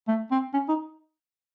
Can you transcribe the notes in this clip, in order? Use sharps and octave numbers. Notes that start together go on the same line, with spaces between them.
A3
C4
C#4
D#4